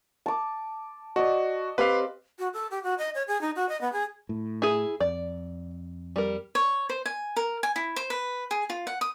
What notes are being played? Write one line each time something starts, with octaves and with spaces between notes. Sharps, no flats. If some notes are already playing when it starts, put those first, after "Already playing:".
A5 D6
F#4 D5 D#5
C4 G4 B4 C5 F5
F#4
A4
G4
F#4
D#5
C#5
G#4
D#4
F#4
D#5
B3
G#4
A2
E4 G#4
F2 D5
G3 A#4
C#5
C5
G#5
A#4
G#5
E4
C5
B4
G#4
F4
F#5
D#6